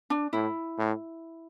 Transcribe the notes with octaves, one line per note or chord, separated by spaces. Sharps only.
D4
A2 E4
A2